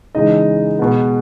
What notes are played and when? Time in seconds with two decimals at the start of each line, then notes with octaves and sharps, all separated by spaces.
0.15 C#3 E3 G#3 D#4 D#5
0.79 B2 G#3 B3